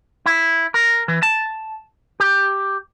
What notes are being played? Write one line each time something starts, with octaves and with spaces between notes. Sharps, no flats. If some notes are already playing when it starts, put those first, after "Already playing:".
E4
A#4
E3
A5
G4